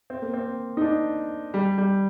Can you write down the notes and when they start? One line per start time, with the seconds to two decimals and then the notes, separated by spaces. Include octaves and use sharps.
0.10 C4
0.22 A#3
0.34 C4
0.77 D#4
0.82 D4
1.54 G3
1.78 G3